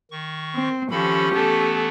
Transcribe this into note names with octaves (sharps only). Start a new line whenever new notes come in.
D#3 C#6
C4
D#3 F3 C#4 G4 A4 B5
E3 A3 B3 A4